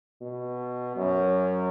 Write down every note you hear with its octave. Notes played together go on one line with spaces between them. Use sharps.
B2
F#2